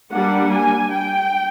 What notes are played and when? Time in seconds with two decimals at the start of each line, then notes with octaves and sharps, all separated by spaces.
0.12 G3 A#3 D4 F#5
0.51 G#5
0.91 G5